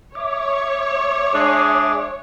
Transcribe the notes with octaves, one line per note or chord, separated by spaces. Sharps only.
C#5 E5 D6
G#3 D4 G#4